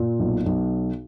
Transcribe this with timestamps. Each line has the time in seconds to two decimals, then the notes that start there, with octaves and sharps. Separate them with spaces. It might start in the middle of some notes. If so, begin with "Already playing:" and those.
Already playing: A#2
0.19 B1
0.46 B1